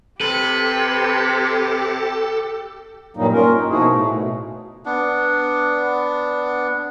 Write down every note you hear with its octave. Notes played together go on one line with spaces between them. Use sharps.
C3 G4 A4 B4
G2 A#2 F#3 G3 A#3 D#4
A#3 C#4 F4 A#4
D#4
B2 F3 D#4 E4 F#4 G#4
A2 A3
B2
B3 D4